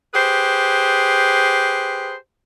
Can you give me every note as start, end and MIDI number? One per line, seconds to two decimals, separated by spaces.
0.14 2.15 67
0.14 2.15 68
0.14 2.15 71
0.14 2.15 72